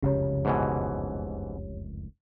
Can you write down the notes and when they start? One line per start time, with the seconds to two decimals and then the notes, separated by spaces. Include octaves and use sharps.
0.03 F1 C#2 F#2 C#3 G4 C#5
0.45 G#2 B2 E3